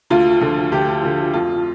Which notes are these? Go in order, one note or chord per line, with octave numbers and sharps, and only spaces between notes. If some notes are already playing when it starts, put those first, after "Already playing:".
D2 F4
D3 F3
D2 G4
D3 F3
F2 F4